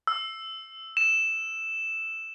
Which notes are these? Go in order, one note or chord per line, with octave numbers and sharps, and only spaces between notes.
E6
E7